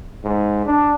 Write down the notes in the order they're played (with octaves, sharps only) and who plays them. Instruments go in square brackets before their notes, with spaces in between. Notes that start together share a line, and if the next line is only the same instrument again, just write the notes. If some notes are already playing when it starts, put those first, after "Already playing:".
[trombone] G#2
D4